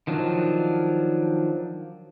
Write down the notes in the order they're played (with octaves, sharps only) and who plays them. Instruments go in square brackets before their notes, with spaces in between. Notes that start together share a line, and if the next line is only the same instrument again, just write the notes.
[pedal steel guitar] D#3 F3 F#3 D4